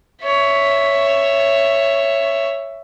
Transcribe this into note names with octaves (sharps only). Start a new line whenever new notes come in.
C#5 E5